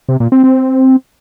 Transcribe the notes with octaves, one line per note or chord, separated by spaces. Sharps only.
C3
A#2
C4
C4